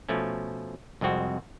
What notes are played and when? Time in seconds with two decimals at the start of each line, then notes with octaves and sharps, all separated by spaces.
0.09 B2 F3 A3 C#4
1.01 C2 F2 G#3 C4 F#4